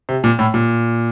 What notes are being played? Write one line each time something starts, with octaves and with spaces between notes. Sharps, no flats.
C3
A#2
A2
A#2